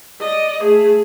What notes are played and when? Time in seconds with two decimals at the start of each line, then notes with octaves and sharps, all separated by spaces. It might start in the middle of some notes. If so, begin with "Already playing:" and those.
0.21 D5 D#5
0.62 A3 G#4